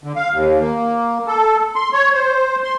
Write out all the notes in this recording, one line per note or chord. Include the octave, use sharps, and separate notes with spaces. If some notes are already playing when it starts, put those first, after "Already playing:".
D3
F5
D#2
A#3
A4
C6
C#5
C5
C6